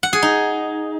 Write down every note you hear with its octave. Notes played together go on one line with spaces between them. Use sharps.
F#5
G#4
D#4